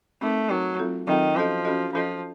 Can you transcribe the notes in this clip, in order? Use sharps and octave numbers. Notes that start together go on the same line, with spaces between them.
A3 C4 D#4 A#4
F#3 C4 D#4 A#4
F#3 C4 F4 A4
D#3 F#3 C4 F4 A4
F3 C#4 F#4 A4 D#5
C#4 F#4 A4 D#5
F3 C#4 A4 D#5